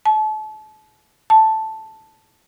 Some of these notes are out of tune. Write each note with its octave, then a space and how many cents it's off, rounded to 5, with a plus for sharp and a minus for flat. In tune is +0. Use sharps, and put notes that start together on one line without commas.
A5 -35
A5 +0